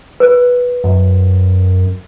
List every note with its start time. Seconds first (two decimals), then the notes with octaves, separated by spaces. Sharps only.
0.20 B4
0.84 F#2